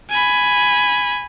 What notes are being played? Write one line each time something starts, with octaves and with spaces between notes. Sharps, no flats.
G#5 B5